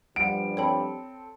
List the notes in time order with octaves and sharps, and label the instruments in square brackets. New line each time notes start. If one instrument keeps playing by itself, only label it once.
[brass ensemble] G2 F3 G3 [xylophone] F#5 [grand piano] D7
[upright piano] C4 A4 [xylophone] C#5 G5 B5